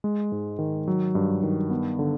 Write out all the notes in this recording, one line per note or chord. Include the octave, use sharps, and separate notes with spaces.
G#3
G#2
D#3
F#3
G2
D#3
B3
D3